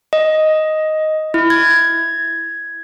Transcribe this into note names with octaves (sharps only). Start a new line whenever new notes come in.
D#5
E4
G#6